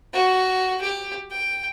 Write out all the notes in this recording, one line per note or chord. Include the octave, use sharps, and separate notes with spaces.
F#4
G4
G5